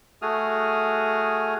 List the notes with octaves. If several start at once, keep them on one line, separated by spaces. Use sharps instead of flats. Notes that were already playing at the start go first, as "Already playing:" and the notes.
A3 F#4 G#4 D#6 F6